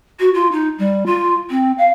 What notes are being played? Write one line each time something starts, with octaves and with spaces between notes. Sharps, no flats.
F#4
F4
D#4
G3
F4
C4
F5